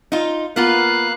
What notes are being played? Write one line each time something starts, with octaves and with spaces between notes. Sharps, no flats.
D#4 F4
A#3 B3 F4 B4 F5 F#6